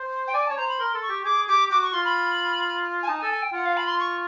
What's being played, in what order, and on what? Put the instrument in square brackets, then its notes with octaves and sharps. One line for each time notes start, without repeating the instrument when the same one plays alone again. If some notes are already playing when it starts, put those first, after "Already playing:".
Already playing: [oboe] C5
[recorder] G5
[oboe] D5 [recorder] G#5
[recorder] A5
[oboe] C#5
[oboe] C5 [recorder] A#5
[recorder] B5
[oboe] A#4 [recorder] C6
[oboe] A4
[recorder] C#6
[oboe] G4
[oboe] G#4 [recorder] D6
[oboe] G4 [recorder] D6
[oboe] F#4 [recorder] D6
[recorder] C#6
[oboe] F4 [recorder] C6
[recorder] B5
G#5
[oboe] D#4 [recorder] A5
[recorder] G#5
[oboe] A4
[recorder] G#5
G5
[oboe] F4 [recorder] F#5
[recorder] F5
B5
C6
C#6